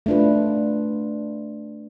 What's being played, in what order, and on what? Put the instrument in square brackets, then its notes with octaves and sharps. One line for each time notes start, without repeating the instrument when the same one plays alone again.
[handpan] A3 D4 F4 B4